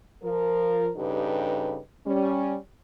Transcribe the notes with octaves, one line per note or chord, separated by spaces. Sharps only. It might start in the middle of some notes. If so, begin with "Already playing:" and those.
F3 A#4
G2 C#3 D#4 G4 A4 B4
G3 C#4